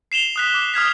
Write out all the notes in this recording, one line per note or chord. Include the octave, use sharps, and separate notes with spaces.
C7 E7 F7 G7
D#6 F#6 B6
D6
D#6 F6 G#6 B6